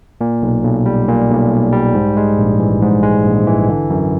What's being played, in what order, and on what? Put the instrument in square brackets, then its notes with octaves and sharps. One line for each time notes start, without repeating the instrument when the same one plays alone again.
[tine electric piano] A#2
B1
B1
G3
A#2
B1
B1
G3
G#2
G#3
A#1
E3
G#2
G#3
A#1
E3
D3
F#2